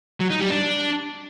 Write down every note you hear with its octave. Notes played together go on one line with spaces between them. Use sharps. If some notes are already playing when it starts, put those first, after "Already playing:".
F#3
D#4
G3
D4